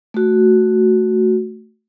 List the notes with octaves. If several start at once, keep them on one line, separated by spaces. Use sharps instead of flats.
A3 F#4